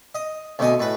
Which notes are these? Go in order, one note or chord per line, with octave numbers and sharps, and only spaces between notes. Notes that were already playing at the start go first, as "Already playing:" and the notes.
D#5
D2 B2 D#5 G#5
A2 B4